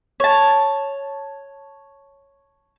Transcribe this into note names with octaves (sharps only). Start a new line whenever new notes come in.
C#5 A5